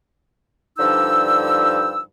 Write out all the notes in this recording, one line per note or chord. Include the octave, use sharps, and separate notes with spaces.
G2 D3 F3 D#4 E6